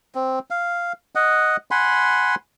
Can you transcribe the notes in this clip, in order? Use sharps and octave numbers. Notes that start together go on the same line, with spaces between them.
C4
F5
D#5 F#5
F#5 G#5 B5 C6